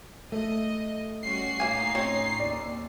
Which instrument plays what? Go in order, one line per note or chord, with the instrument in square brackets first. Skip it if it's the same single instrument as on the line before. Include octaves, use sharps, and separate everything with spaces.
[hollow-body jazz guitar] A3 [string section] D#5
[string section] G3 C#4 F#4 [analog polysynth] C7
[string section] A2 D#4 [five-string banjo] A#3 G#5
[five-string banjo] C4 C#4 C#5
[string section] D#2 [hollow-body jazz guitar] D5